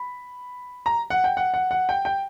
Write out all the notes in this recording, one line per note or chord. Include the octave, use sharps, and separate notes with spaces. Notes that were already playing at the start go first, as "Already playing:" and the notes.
Already playing: B5
A#5
F#5
G5
F#5
F#5
F#5
G5
G5